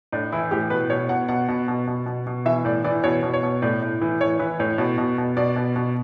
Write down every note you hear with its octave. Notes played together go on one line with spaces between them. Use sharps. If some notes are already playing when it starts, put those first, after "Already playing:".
A2 D4
E3 E4
A2 G4
B2 B4
B2 C#5
B2 F#5
B2 F#5
B2
B2
B2
B2
B2
E3 E5
A2 D5
E3 D5
B2 C#5
B2
C#5
B2
A2 D5
A2
E3
A2 C#5
E3 B4
A2 C#5
B2
B2
B2
B2 D5
B2
B2